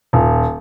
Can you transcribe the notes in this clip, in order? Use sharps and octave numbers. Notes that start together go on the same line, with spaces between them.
D#1